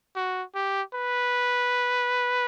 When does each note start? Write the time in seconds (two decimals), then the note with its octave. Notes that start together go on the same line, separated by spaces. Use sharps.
0.16 F#4
0.55 G4
0.94 B4